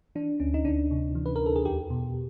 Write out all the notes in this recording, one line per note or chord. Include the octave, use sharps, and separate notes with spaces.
E3 D4
D2 C#4
D#4
D2 D4
C3
E3
B4
D2 A#4
A4
G#4
E2 G4
B2